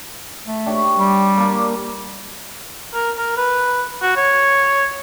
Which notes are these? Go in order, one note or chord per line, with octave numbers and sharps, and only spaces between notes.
A3
D4 G4 C#5
G3
A#3 D4
A#4
A#4
B4
F#4
C#5